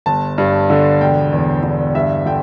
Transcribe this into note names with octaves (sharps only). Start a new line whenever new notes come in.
G1 A5
G2
D3
E1 G5
E2
D3
G2 E5
D3 G5